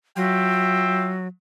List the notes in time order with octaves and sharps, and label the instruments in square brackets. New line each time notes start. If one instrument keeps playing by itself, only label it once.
[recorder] F#3 [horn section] F4 E5 G5